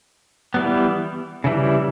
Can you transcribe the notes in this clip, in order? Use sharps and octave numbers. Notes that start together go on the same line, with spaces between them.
E3 G3 B3
C#3 E3 G3